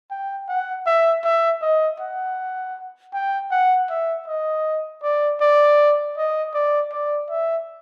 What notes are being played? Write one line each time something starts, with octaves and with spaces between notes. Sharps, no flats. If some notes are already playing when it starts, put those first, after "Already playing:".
G5
F#5
E5
E5
D#5
F#5
G5
F#5
E5
D#5
D5
D5
D#5
D5
D5
E5